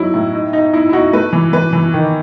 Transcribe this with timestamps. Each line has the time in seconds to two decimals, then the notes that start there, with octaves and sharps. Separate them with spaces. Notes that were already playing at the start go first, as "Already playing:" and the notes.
Already playing: F#3 D#4 E4
0.14 A2
0.34 D#4
0.53 D#4
0.73 D#4 E4
0.89 E4
0.93 D#4 F#4
1.13 A3 B4
1.33 E3
1.53 E3 B4
1.73 E3
1.94 D#3